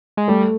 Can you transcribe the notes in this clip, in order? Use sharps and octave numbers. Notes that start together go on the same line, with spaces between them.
G#3
G3 A3